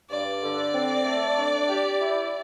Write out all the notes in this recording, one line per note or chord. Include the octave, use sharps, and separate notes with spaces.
G2 D5
D3
C4
A3
D4
G4
E4